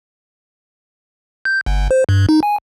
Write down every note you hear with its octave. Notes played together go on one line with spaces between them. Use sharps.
G6
G1
C5
G2
D#4
G#5